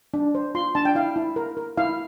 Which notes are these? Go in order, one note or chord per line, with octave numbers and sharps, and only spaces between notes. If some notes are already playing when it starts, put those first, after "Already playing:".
D4
C5
F4 C6
D4 A5
G5
E4 F5
E4
A#4
A#4
E4 F5